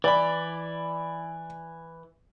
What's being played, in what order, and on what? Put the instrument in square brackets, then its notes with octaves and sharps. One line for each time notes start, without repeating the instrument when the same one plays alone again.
[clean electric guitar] E3 [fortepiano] D5 B5